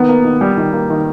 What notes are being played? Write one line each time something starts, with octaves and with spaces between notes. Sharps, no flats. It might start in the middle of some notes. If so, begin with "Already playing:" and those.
Already playing: D#3 B3
A#3
D#3
G3
D#3
A#3
D#3